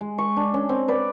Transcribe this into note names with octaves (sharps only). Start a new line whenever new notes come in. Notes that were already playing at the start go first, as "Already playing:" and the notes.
G#3
C#6
D4
C#4
C4
B4 D5 G5